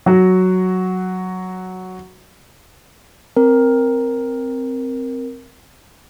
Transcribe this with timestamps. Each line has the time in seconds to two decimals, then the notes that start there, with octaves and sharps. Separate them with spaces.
0.06 F#3 F#4
3.37 C4 A#4